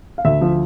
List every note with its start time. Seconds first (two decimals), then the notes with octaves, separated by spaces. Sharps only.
0.18 F5
0.25 D2 E5
0.41 F3